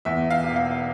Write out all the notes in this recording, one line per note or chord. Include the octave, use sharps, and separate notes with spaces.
E2 E5
F5
E1
F5